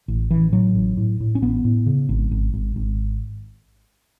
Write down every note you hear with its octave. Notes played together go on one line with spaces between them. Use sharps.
A1
A1 E3
A2 F#3
A1
A2
A2
C#4
A1 B3
A2
C#3
G#1
G#1
G#1
G#1